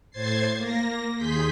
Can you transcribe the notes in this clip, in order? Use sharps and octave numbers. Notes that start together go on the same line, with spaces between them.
A2 C5 G#6 A6 C7
A#3 A#6
D#2 G#4 C6 G6 B6